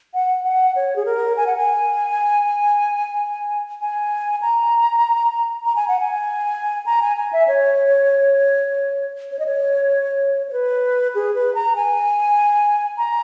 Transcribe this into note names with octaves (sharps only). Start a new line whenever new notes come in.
F#5
F#5
C#5
G#4
A#4
G#5
F#5
G#5
G#5
A#5
A#5
G#5
F#5
G#5
A#5
G#5
G#5
E5
C#5
C#5
D#5
C#5
C#5
B4
G#4
B4
A#5
G#5
A#5